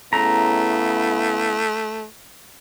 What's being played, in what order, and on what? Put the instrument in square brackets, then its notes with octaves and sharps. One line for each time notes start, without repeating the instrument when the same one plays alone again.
[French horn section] C#3 B3 E4 [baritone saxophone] A3 [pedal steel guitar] A#5